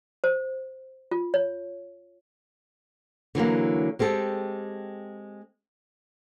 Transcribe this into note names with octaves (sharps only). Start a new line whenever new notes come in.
C5
F4
C#5
D3 E3 F#3 A#3
G#3 C4 G4 A4